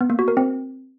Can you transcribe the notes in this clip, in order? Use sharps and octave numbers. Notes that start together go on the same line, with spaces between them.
B3
A#3
F#4
A#4
C4